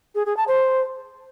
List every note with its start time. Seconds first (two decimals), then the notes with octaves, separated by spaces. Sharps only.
0.15 G#4
0.26 G#4
0.37 A5
0.48 C5